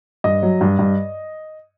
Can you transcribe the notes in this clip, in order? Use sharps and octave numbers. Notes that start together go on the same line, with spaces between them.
G2 D#5
F#3
G2
G2